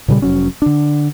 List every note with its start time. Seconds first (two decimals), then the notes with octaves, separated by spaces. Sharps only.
0.08 A#2 C#3 G3
0.22 F1 F#3 C#4
0.62 D3 D4